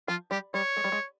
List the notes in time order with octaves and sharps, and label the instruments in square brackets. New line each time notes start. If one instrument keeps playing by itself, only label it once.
[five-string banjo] F3 [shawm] F4
[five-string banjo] G3 [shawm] G4
[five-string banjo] G3 [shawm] C#5
[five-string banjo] G#3
G3
G#3